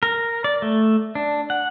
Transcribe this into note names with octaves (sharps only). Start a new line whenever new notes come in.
A#4
D5
A3
D4
F#5